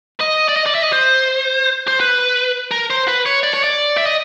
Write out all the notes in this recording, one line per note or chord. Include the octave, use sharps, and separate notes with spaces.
D#5
D5
D#5
D5
E5
D#5
C5
C5
B4
A#4
C5
B4
C#5
D5
C#5
D5
E5
D#5